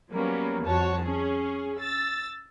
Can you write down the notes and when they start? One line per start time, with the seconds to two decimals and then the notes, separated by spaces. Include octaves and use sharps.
0.11 F#3 G3 A#3 B3 C#4
0.64 F2 F#4 C#5 A5
1.02 C#4 G#4
1.79 E6 A6